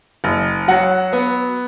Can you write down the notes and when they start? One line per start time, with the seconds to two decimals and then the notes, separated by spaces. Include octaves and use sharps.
0.24 F#1
0.68 F#3 F#5
1.13 B3